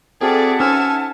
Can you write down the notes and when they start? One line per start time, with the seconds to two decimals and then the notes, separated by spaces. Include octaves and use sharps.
0.21 C4 F#4 G#4 A4 D5 E5 F#5 A5
0.60 C#4 D#4 C5 G#5 E6 F6